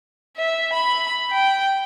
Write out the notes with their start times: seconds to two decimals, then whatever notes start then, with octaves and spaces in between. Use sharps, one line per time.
0.37 E5
0.73 B5
1.32 G5